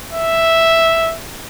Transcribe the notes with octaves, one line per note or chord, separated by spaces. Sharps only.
E5